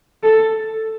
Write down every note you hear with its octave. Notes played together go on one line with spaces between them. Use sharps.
A4